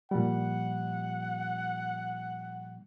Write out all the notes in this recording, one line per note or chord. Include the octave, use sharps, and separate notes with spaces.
A#2 F3 G3 F#5